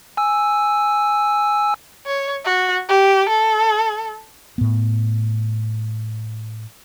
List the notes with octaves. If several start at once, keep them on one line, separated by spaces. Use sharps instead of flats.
G#5 E6
C#5
F#4
G4
A4
A2 B3